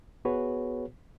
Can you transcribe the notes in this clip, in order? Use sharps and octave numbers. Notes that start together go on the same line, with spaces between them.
B3 F#4 G#4 B4 C#5